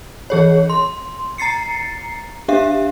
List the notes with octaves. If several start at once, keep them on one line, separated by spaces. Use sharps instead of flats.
E3 G#4 C#5
C6
A#5 A6 C7 C#7
D4 G4 E5 F5